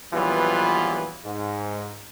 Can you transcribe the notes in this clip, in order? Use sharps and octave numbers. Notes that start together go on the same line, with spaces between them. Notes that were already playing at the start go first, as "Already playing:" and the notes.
A#1 E3 F#3 G3 B3 F4
G#2